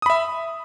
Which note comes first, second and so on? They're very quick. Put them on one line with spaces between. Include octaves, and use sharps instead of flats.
D#6 B5 E5